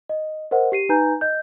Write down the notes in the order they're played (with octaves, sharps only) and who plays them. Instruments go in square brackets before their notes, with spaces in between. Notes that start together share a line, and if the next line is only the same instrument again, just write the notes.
[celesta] D#5
A#4 C5 D#5 F#5
G4 C7 D#7
D#4 B4 G#5 A#5 G6
D#5 G6